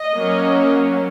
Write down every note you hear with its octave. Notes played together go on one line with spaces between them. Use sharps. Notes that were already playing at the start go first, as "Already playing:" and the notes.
Already playing: D#5
F#3 A#3 C#4